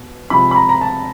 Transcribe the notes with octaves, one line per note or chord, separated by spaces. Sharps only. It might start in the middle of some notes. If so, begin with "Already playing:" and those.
Already playing: B2
C3 F3 G#3 B5
B5
A#5
A#5
A5